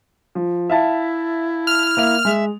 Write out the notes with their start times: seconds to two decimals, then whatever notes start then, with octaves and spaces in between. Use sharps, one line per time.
0.35 F3
0.70 E4 E5 F5 A5
1.67 F6
1.97 A#3 E5 F7
2.25 G#3 E5